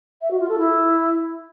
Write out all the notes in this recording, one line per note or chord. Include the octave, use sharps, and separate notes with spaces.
E5
F#4
F4
A4
E4